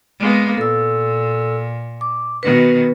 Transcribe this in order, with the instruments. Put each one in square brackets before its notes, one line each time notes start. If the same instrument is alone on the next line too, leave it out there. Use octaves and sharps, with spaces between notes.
[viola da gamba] G#3 A#3 B3
[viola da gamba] A#2 [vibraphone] A4 E6
[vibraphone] D6
[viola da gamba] B2 D#3 F#4 [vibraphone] B3 B4